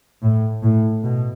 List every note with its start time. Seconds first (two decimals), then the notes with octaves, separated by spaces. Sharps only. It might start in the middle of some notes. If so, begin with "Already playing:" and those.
0.23 A2
0.64 A2
1.03 B2